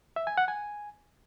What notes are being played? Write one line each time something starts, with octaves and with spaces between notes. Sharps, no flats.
E5
G#5
F#5
G#5